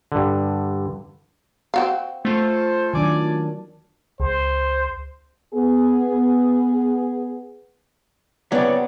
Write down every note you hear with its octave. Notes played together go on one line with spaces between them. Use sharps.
G2 D3
C4 F#4 F5
A3 F4 A4 C5
D#3 F#3 D4 D5 G#5
C#2 C5
B3 G#4
C#3 F#3 B3 C4 E4 D5 F#5